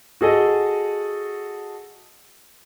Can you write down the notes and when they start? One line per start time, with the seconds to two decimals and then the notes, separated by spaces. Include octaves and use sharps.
0.21 F#4 G#4 A4 D#5